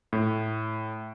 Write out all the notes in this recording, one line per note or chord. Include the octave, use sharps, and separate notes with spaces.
A2